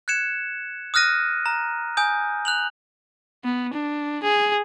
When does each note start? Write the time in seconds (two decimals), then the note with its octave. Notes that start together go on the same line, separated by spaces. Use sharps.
0.08 F#6 G#6 C#7 E7
0.94 D#6 F6 F#6 A#6 D#7
1.46 A#5
1.97 G#5 D#6 G6
2.45 F#6 F7 F#7
3.45 B3
3.73 D4
4.23 G#4